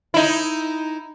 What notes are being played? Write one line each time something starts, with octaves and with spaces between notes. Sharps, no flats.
D#4 E4